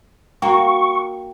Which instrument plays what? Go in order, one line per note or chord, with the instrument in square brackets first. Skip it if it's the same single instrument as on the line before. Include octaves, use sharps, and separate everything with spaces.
[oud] A#3 F#4 [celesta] G5 [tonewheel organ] C#6